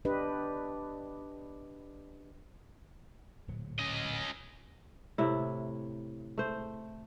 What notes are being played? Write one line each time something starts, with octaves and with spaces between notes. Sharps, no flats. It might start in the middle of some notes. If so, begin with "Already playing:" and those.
D4 G4 B4 D#5
D1 A#2 F#3
C#4 D#5
A2 C3 E4
A3 C5